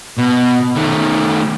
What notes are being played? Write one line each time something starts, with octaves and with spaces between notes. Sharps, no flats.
B2
D#3 A3